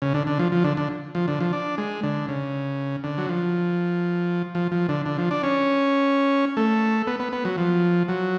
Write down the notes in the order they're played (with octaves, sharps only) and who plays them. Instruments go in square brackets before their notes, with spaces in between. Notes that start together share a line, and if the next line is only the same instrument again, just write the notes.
[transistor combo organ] C#3
D3
D3
F3
F3
D3
D3
F3
D3
F3
D4
G#3
D3
C#3
D3
F#3
F3
F3
F3
D3
D3
F3
D4
C#4
A3
B3
B3
B3
F#3
F3
F#3